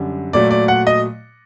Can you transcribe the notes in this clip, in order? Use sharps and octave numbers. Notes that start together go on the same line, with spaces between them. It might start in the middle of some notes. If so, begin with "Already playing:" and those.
Already playing: F#2 D3 G3
A#2 F#3 A3 D5
D5
F#5
D#5